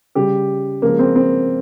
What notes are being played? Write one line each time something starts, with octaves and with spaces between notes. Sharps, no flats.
C#3 G3 G4
C#3 F3 G#3 A#3
C4
C4